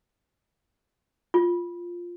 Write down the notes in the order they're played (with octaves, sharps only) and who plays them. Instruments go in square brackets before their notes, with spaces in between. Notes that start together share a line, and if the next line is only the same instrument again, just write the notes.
[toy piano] F4